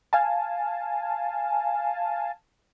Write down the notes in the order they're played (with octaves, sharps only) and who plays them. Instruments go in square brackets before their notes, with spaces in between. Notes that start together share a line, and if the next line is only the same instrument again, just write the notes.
[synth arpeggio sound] F5 G#5 A5